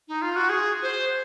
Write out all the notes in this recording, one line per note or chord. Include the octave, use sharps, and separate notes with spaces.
D#4
F4
F#4
G#4
C5